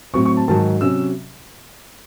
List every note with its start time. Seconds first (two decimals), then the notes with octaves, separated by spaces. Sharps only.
0.14 A2 F#3 C4 C#6
0.25 C#6
0.37 A5
0.48 G#2 D#3 F#3 A5
0.81 C3 F#3 C#4 E6